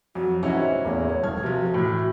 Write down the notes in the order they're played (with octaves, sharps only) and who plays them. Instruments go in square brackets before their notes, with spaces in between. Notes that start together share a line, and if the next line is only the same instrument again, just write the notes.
[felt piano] F2 F#3 [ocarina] F#4
[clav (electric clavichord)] G#2 C3 E3 [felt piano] C#4 E4 F#4 [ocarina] E5
[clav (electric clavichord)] E2 A2 A#3 [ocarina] C#5
[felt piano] D#1 F6 G#6 [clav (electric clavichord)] A3
[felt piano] C3 F3 [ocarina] F#4
[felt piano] A2 E3